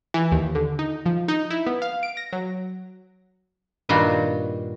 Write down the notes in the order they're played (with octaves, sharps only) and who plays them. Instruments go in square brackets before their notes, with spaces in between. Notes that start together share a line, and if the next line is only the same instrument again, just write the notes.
[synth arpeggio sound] E3
D#2
D3
D#4
F3
D#4
E4
B3
F5
D7
A#6
F#3
[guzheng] G2 A#2 D#3 G3 F#4 C6